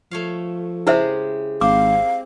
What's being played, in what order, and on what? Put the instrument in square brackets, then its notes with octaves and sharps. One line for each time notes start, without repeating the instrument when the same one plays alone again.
[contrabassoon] F3 [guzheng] A3 C#5 F5
[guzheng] C#3 G#3 G4 [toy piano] E4 C5 E5
[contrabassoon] G#1 [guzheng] C4 [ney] F5 [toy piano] D6